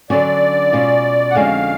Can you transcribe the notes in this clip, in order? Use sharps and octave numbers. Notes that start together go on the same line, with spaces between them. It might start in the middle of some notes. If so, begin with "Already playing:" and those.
D3 F#3 C#4 F#4 D5
B2 G#3 C#4 F4
F#5
F2 D3 G#3 C#4 F#4 F5